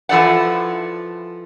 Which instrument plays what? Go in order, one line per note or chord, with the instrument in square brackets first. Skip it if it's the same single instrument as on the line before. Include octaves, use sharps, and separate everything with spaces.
[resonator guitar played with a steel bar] E3 F3 A4 D5 F#5